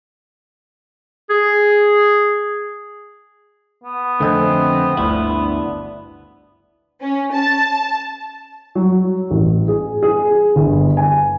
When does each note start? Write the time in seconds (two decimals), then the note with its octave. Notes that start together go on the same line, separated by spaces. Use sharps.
1.30 G#4
3.84 B3
4.20 F2 D3 A3 C4 D#5 G#5
4.97 G1 D2 D4 E4
7.02 C#4
7.34 A5
8.75 F#3
9.31 A1
9.68 G#4
10.03 G#4
10.56 G1
10.97 G#5